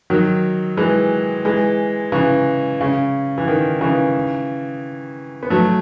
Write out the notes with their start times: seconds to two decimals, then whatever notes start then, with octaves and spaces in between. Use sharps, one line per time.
0.10 D#3 F#3
0.77 E3 G#3
1.45 E3 G#3
2.12 C#3 E3
2.81 C#3
3.38 E3
3.48 D#3
3.81 C#3 E3
5.43 B3
5.50 F#3 A3